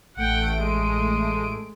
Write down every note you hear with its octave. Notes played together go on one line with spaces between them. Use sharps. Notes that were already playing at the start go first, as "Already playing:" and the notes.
A1 A3 F#5 G5 D7
G#3